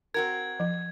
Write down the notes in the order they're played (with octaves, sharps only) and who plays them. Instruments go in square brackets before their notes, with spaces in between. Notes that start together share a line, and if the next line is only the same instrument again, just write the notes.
[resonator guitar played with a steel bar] C4 F#4 A#4 [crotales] G#6
[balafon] F3